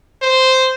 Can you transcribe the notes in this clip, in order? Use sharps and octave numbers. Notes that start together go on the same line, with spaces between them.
C5